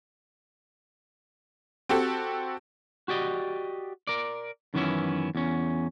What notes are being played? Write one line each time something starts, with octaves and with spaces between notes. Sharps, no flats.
C4 F#4 G4 A4
F#4 G4 D5 D#5
A#4 D5
F#2 D#3 E3 B3 C#4 E4
E2 C#4